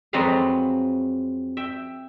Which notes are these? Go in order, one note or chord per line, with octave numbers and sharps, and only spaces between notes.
F2 F#3 G#3 C4 B4 F5
E5 G5